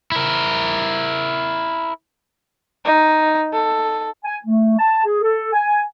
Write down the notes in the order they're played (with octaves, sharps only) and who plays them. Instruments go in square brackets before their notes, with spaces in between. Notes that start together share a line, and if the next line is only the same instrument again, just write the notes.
[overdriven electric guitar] E4 A#4
[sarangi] D#4
A4
[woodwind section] G#5
A3
A5
G#4
A4
G#5